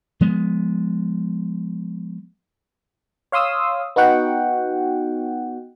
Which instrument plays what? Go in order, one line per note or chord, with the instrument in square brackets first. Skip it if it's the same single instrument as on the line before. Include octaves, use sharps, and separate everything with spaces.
[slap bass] F3 G#3 B3
[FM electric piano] C#5 F5 C6 D#6 E6
B3 D#4 F#4 F#5 G5